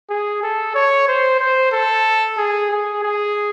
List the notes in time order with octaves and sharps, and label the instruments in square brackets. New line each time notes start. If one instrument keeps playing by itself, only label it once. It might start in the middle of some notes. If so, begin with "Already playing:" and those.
[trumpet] G#4
A4
C#5
C5
C5
A4
G#4
G#4
G#4